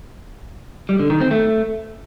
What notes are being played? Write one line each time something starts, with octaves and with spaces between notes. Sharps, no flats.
G3
D3
D#3
C4
A3